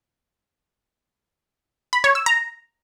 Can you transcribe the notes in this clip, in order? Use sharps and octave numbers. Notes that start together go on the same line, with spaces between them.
B5
C#5
E6
A#5